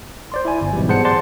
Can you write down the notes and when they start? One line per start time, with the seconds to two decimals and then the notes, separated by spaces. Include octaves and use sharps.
0.32 C5 D5 C6
0.45 E4 G#5
0.61 G1
0.73 G#2 B2 E3 F#3 G3
0.89 B3 G#4 C5 F#5 A5 C#7
1.04 C5 D5 F#5 A5 C6 A6